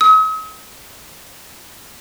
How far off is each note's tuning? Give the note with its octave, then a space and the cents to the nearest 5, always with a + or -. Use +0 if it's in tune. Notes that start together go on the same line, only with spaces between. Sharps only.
D#6 +45